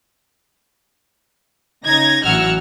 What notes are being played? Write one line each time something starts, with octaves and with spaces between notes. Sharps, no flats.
C#3 D#4 G#6 A#6
A1 E3 F#3 F#5 E6 F6